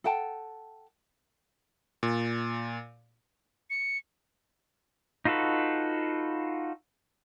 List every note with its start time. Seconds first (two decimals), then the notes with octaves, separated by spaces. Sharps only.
0.04 A4 F#5 G5 A5
2.03 A#2
3.70 C#7
5.25 D#4 F4 F#4 A4 B4